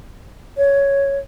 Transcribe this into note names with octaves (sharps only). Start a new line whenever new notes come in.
C#5